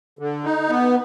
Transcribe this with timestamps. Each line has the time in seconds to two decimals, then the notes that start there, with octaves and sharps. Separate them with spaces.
0.19 D3
0.44 D#4
0.69 B3